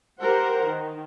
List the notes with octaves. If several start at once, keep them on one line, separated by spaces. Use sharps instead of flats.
G4 A#4 C5 F#5
D#3